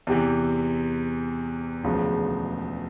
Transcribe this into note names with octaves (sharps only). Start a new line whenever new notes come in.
E2 C3 E3
E1 D2 C#3 F3 G#3